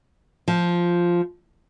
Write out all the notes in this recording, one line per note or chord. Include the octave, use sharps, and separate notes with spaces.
F3